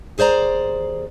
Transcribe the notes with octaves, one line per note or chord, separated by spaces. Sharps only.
D#2 G#4 C5 D5 A#5